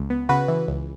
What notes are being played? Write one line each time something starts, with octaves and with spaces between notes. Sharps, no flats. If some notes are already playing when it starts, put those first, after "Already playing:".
Already playing: C#2
B3
C#3 F#4 B4
E3
C#2